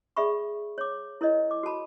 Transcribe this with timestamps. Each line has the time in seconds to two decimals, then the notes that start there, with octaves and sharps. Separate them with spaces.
0.17 G#4 D5 E5 B5 C#6
0.78 C#5 D6
1.21 E4 A#4 C#5 D#5
1.51 D6
1.63 F#4 A4 A5 B5